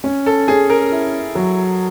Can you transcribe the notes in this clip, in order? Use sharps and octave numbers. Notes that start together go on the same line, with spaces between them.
C#4
A4
C#4 G#4
A#4
E4
F#3